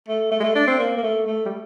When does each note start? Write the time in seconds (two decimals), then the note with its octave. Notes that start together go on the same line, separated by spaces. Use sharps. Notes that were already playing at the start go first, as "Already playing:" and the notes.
0.08 A3
0.31 A3
0.40 G#3
0.44 A3
0.55 D4
0.67 C4
0.80 A#3
0.97 A#3
1.03 A3
1.27 A3
1.46 G3